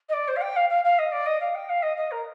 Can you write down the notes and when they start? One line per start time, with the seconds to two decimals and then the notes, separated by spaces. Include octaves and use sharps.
0.09 D#5
0.13 D5
0.28 C5
0.36 F5
0.41 G5
0.56 F5
0.69 F5
0.84 F5
0.98 D#5
1.12 D5
1.26 D#5
1.40 F5
1.55 G5
1.69 F5
1.82 D#5
1.97 D#5
2.11 A#4